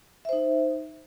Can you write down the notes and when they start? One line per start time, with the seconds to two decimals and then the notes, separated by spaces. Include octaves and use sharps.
0.25 E5
0.29 C5
0.33 D#4